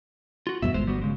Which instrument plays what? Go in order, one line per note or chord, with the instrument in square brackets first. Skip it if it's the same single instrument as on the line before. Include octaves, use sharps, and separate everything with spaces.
[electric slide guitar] F4 F#4
[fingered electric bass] E2 G2 B2 [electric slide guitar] E5
[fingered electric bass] G1 [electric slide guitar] G#3 C5
[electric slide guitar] G3 B3 F#4
C#3 G#3